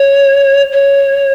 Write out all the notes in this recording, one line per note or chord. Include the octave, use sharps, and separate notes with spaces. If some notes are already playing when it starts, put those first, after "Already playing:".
Already playing: C#5
C#5